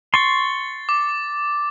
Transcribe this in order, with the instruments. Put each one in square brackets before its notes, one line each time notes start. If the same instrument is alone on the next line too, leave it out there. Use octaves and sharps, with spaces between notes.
[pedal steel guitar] C6 C#6 [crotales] A6
[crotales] D6